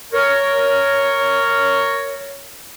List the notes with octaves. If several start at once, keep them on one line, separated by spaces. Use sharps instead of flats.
A#4 C#5